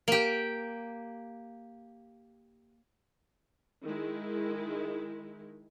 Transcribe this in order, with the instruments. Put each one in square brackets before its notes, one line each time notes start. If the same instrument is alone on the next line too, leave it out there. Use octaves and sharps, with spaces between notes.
[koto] A#3 G4
[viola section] D#3 G#3 E4